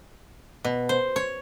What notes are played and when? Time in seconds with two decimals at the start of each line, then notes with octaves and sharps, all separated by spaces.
0.65 B2
0.89 C5
1.16 C#5